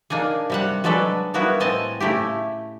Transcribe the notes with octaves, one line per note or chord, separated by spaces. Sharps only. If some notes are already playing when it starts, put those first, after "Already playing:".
A#3 D4 D#4 G#4
C3 G3 F#5
F#3 G#3 D4 A4 B4 D5
G3 A#3 B3 E4 F#4
A2 C4 D#5 G#5 A5
C#3 A3 E4 G4